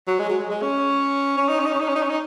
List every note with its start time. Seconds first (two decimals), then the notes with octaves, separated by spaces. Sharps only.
0.07 F#3
0.19 G#3
0.30 F#3
0.40 G#3
0.50 G#3
0.62 C#4
1.37 C#4
1.49 D#4
1.59 C#4
1.66 D#4
1.74 C#4
1.81 D#4
1.89 C#4
1.95 D#4
2.03 C#4
2.10 D#4